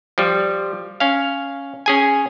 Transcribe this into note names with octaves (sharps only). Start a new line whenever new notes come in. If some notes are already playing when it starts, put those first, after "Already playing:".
F3 G3
C#4 F5
C#4 G#4 G#5